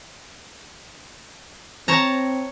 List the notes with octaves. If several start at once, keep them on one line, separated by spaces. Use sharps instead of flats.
C4 C#5 A5 A#5